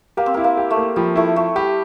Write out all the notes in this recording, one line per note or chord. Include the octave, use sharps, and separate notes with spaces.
A#3 G4
C4
A#3 E4
A#3
G4
A3
A#3
F3 G3
A3 E4
A3 E4
G3 G4